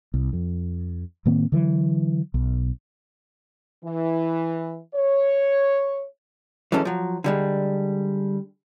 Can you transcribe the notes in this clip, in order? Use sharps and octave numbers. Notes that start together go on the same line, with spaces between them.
C2
F2
A2 D#3 A#3 C4
D3 E3 F#3
B1
E3
C#5
E3 F#3 G#3 C#4 A4
F3 F#3
D3 G3 G#3